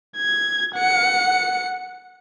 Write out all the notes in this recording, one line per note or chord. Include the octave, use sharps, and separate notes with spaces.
G#6
F#5 C#7